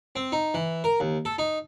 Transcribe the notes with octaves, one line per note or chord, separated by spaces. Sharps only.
C4
D#4
E3
A#4
D#2
A4
D#4